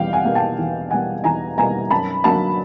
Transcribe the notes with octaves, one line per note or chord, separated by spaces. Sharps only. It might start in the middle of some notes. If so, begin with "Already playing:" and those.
Already playing: E2 B2 G3 F5 G5
F#5 G#5
B2 G3 A#3
G5 A5
E2
B2 G3 A#3 F#5 G#5
E2 G#5 A#5
B2 G3 A#3 G#5 A#5
F#2 A5 B5
D3 F#3 A#3 A5 B5